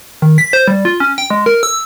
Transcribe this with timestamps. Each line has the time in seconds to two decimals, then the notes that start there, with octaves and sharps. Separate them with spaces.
0.22 D#3
0.38 B6
0.53 C5
0.68 G3
0.85 F4
1.00 C#4
1.18 G5
1.30 G#3
1.46 A#4
1.63 E6